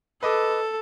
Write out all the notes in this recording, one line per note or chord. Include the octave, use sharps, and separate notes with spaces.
A4 B4 D#5 D6